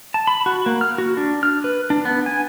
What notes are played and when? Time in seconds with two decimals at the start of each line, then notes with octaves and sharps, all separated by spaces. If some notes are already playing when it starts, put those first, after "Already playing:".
0.14 A5
0.27 B5
0.46 F#4
0.66 A#3
0.81 F6
0.98 F#4
1.17 D4
1.43 F6
1.64 B4
1.90 D4
2.05 B3
2.26 G#5